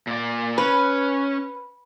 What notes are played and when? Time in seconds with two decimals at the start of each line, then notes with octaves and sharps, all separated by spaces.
0.07 A#2 D5
0.58 C#4 B4